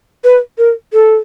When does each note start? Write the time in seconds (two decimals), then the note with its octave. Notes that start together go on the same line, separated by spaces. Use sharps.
0.24 B4
0.58 A#4
0.94 A4